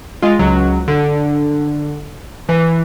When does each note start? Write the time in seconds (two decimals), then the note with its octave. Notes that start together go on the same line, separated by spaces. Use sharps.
0.22 G#3 F4
0.39 C#2 F#3
0.88 D3
2.49 E3